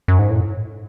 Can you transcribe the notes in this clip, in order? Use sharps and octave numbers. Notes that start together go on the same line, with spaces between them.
F#2
G#2
A2